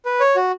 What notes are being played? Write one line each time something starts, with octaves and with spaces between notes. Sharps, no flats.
B4
C#5
F#4